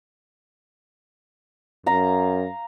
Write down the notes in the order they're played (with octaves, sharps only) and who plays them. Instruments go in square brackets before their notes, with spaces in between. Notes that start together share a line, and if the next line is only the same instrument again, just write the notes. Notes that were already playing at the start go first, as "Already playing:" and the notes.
[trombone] F#2 [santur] F5 A#5